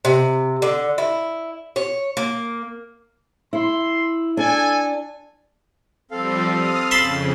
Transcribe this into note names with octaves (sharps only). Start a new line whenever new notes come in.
C3
D3
E4
C#5
A#3
E4 C6
D4 A4 G#5
F3 G3 C4 A4 F5
D#6 F6
F2 C#3 A5 B5 C6